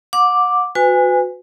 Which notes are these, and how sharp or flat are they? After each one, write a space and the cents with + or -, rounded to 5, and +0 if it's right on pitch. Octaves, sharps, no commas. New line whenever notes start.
F#5 -30 D6 +0
F#4 -25 B4 +30 G#5 -20